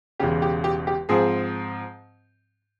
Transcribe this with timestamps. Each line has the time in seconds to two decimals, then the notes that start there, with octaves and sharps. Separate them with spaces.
0.20 E1 E2 C#3 G4
0.42 G4
0.64 G4
0.87 G4
1.09 G#2 F3 C4 G#4